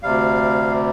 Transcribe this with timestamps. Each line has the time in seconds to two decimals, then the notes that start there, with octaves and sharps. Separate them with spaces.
0.03 D2 C3 G3 F5